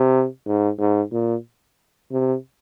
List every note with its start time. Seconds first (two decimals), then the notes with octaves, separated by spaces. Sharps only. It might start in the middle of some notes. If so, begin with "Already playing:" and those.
Already playing: C3
0.46 G#2
0.79 G#2
1.12 A#2
2.12 C3